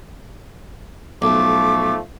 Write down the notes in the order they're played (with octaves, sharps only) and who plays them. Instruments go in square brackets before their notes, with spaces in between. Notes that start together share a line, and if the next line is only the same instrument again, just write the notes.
[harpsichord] B1 [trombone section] F3 A3 [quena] D6